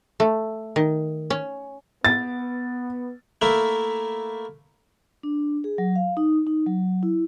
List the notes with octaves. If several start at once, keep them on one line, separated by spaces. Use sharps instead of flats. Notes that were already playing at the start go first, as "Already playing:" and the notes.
A3
D#3
C#4
B3 A6
A3 A#3 E4 A#4
D4
G#4
F#3
F5
D#4
D#4
F#3
E4